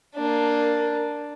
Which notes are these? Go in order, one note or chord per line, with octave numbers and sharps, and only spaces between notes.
A#3 D4